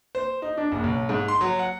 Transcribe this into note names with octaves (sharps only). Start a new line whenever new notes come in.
C5
D#4
D4
F#1
B1
G#2
C6
F#3
F#5